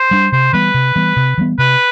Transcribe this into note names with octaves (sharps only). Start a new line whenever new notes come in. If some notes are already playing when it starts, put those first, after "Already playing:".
Already playing: C5
G3 D4
C3 C5
E3 G3 B3 B4
C3
E3 G3 B3
C3
E3 G3 B3
C3 B4